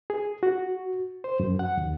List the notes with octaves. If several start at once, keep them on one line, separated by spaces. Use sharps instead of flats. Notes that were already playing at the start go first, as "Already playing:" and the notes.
G#4
F#4
C5
F#2
F#5
D#2